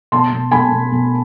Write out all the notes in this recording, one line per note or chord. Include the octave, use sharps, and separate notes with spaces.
B2 A5 C6
B2
B2 G#5 B5
B2
B2